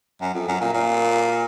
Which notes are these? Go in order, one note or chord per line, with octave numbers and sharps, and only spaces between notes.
F#2
F2
F#2
A#2
A#2